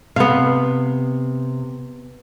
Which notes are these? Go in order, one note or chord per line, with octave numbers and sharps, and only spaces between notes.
C3 B3 F5